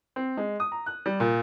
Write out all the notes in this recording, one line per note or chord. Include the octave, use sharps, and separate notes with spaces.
C4
G#3
D#6
A#5
F#6
G3
A#2